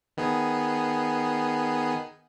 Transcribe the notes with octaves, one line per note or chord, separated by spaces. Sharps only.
D#3 B3 G#4